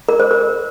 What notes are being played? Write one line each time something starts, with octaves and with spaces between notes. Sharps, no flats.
A#4
C5
A#4